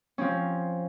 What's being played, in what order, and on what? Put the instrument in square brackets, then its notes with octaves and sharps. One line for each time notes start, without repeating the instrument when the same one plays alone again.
[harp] F3 C4 C#4